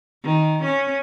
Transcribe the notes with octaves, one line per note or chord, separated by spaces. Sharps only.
D#3
C#4